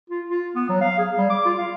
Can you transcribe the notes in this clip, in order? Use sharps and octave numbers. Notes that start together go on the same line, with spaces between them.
F4
F4
B3
F#3
F5
G#4
G3
D6
F4
F5